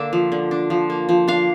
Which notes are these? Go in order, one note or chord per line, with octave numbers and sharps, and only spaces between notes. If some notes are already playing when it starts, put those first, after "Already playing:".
Already playing: D3 A#3 D4 E5
F3
D3
D4
F3
A#3
F3
D4 F5